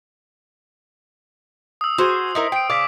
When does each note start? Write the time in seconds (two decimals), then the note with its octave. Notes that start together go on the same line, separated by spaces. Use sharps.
1.81 D#6 E6
1.98 F#4 G#4 C5
2.35 D#4 E4 A#4
2.52 G5 C7 D7
2.70 C#3 D5 F5 D6 B6